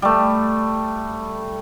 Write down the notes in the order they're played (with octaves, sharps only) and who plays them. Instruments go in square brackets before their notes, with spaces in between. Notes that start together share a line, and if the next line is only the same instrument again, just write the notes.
[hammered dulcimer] G3 A3